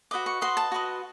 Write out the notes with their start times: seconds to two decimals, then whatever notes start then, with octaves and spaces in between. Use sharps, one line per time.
0.11 F#4 B4 D#5 D6
0.26 C#6
0.41 F#4 B4 D#5 C6
0.57 A5
0.72 F#4 B4 D#5